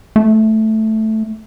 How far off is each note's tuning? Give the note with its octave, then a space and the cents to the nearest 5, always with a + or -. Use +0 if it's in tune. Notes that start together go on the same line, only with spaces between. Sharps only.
A3 -5